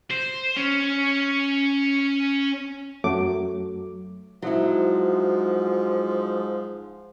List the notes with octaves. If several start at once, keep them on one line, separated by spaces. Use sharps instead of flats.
C5
C#4
F#2 F#3 A3 D6
G#2 F3 F#3 E4